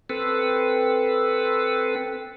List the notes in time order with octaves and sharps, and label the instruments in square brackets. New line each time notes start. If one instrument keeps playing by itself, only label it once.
[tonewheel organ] C4 A4 B4